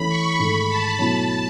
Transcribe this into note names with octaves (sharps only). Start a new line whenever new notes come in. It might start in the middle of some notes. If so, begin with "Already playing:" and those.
Already playing: E3 A3 C#4 E4 B5
C#6
G#2 D#3 A3 B5
A5
B2 F#3 A3 C#4 E4 A5